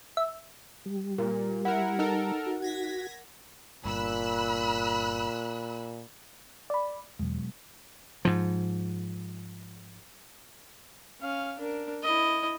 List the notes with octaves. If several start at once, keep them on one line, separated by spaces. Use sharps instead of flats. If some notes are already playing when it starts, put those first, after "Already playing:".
E5
G3
A#2 A#4
E4 A#4 F#5
D#4 A4 A#4
F#4
G#6 A#6 B6
G1 G2 A#2 B5 E6 F#6
D5 B5
E2 B2 F#3 G#3
G#2 F3
C#4 F5
D4 A#4
E4 D#5